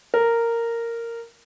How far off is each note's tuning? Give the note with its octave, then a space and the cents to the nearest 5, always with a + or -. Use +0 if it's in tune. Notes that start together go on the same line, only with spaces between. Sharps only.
A#4 -10